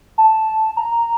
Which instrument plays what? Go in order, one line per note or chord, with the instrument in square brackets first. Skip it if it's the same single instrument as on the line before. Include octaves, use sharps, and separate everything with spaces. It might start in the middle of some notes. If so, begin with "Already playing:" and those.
[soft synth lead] A5
A#5